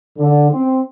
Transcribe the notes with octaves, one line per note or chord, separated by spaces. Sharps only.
D3
C4